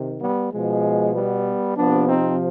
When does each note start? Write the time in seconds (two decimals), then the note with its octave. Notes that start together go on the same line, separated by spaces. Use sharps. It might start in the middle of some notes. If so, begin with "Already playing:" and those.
Already playing: C3 D#3
0.20 G3 B3
0.52 B2 F3 G#3
1.14 G3 B3
1.77 C3 F3 B3 D4
2.08 C4 D#4